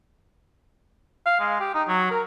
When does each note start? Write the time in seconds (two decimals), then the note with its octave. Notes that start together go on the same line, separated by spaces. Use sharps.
1.26 F5
1.40 G#3
1.60 G4
1.74 D#4
1.88 F#3
2.11 A#4